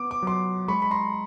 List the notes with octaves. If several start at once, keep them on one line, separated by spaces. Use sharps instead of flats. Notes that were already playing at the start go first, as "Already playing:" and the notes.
Already playing: B3 D6
D6
F#3 C6 D6
G#3 B5 C#6
B5
A#5 C6